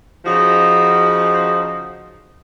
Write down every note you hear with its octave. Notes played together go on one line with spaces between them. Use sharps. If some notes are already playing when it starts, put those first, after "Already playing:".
C#3 F3 D#4 F#4